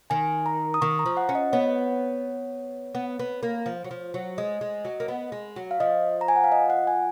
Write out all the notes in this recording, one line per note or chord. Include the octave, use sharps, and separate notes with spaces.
D#3 G#5
A#5
D#6
D#3 C#6
A#5
F3
F#5
C#4
D#5
B3 C#5
B3
B3
A#3
F3
F#3
F3
F#3
G#3 D#5
G#3
F#3
A#3
B3
G#3
F#3
F5
F3 D#5
A#5
G#5
F#5
F5
D#5
F#5
G#5